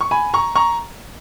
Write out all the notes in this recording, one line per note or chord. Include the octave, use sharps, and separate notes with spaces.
C#6
G#5 B5
A#5 C#6
A#5 C#6